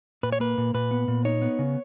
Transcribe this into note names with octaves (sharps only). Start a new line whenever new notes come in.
A#2 B4
C#5
A#3 B4
A#2
A#2 B4
B3
A#2
D#4 C#5
B3
C#3